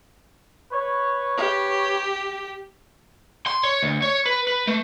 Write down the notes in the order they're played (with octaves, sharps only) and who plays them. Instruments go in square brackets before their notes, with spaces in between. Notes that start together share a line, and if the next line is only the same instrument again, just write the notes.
[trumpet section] B4 C#5
[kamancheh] G4
[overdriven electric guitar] C6
C#5
D2
C#5
B4
B4
A3